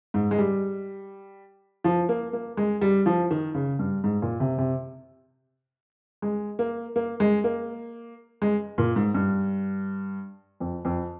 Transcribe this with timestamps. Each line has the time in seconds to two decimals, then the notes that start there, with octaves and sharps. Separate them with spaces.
0.14 G#2
0.31 G#3
0.38 G3
1.84 F3
2.09 A#3
2.33 A#3
2.57 G#3
2.81 G3
3.06 F3
3.31 D#3
3.54 C#3
3.79 G2
4.04 G#2
4.22 A#2
4.40 C3
4.58 C3
6.22 G#3
6.59 A#3
6.96 A#3
7.20 G#3
7.44 A#3
8.42 G#3
8.78 A#2
8.96 G#2
9.14 G2
10.60 F2
10.85 F2